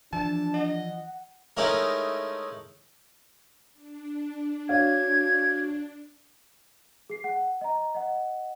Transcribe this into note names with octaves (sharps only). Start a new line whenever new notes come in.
E3 F3 D4 A5
D#5 F#5
G#3 A3 C#4 D#4 E4 A#4
D4
F#4 C#5 D5 F5 G#6
G#4 C7
F#5
D#5 A#5
D#5 F#5